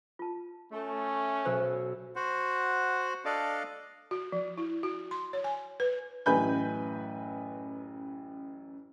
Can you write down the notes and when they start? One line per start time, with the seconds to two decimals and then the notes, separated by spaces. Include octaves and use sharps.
0.19 F4 A5
0.72 A3 C#4
1.45 B1 C5 E6
2.16 F#4 C5 F#5
3.25 D4 A4 D5 D#5 F5 D6
4.11 F#4
4.32 F3
4.58 E4
4.83 F#4
5.11 C6
5.33 C#5
5.44 G#5
5.80 B4
6.26 A1 F#2 B4 G#5 B5 G6